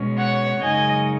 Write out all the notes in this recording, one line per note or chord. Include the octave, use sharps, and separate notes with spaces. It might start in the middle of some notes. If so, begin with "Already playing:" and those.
Already playing: B2 G#3 C#4
C#5 F#5
F#2 C#3 G#3 D#4 D#5 G#5